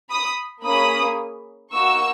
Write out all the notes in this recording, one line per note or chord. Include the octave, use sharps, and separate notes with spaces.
B5 D#6
A#3 C#4 G#4 B5 D#6
A#3 D#4 F#4 C#6 E6